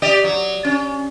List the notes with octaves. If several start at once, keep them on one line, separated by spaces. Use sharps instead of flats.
G4 D5 D#5
F#3
C#4